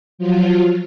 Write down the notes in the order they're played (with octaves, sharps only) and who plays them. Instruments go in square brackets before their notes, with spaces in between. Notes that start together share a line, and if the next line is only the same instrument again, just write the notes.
[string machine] F3 F#3 F4